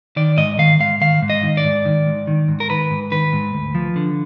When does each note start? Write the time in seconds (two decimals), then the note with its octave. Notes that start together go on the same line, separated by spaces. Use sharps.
0.16 D#3 D5
0.37 G#2 D#5
0.58 D#3 F5
0.80 G#2 F5
1.01 D#3 F5
1.22 G#2
1.30 D#5
1.43 D#3
1.57 D5
1.64 G#2
1.85 D#3
2.06 G#2
2.27 D#3
2.48 G#2
2.60 A#4
2.69 D#3 B4
2.91 G#2
3.12 D#3 B4
3.33 G#2
3.54 D2
3.75 F3
3.96 D3